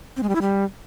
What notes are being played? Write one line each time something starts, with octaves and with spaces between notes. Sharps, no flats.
C4
G#3
G3
E4
G3